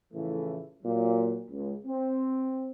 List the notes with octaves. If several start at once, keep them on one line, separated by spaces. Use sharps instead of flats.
A2 C#3 E3 F3 A3
A#2 F#3
C#2
C4